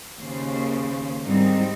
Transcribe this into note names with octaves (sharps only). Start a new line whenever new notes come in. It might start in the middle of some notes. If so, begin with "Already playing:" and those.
D#2 C#3 C5
G#2 D#3 G3 G#3 C4 D#4